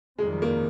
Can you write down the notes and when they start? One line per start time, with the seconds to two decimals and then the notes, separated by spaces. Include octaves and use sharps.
0.19 F2 C3 D#3 G3 G#3
0.42 A#3